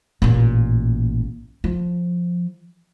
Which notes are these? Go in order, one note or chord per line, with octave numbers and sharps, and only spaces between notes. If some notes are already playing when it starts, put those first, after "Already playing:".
A1 A#2
F3